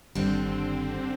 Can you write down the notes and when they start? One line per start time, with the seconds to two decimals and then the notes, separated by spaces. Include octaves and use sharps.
0.15 G1 D3 D#3 G3 C4 D4